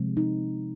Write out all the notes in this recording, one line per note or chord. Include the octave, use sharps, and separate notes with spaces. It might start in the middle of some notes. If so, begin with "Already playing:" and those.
Already playing: C3 F3 G#3
D#4